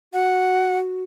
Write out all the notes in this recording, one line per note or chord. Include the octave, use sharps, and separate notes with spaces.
F#4 F#5